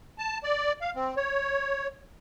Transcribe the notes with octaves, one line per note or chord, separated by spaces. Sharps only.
A5
D5
F5
C4
C#5